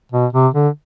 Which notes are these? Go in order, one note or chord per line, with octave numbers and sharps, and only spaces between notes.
B2
C3
D3